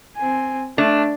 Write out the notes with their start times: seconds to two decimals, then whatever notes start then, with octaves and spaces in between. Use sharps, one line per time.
0.17 C4 G#5
0.78 A3 D4